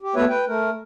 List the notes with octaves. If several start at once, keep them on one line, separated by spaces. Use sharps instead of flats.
G4
A3 B3 F#4 B4 C#5 E5
B4 G5
A3 A#4